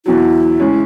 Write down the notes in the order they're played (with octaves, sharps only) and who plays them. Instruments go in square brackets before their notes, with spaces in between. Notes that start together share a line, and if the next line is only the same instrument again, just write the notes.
[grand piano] E2 B2 F#3 [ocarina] E4
[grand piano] C#3 G#3 C#4